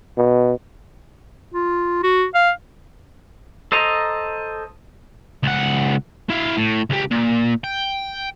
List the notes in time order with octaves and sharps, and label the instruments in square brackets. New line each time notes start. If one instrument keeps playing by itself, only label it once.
[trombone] B2
[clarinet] F4
F#4
F5
[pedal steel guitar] A4 C5 D#5 A#5
[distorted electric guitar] C#2 F#5
E4 F5
A2
C#2 G4
A#2
G5